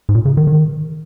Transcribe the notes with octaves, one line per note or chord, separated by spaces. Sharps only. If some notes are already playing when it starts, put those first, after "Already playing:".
G#2
A#2
C#3
D#3
D#3